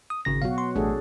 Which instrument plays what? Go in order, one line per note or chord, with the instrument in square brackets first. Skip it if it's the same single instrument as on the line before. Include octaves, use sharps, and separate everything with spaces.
[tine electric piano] D#6
G#1 C#3 A#6
[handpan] B2 F#3 F#4 [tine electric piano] F5
[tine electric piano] C6
[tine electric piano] A1 A3 [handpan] D4 G#4 A4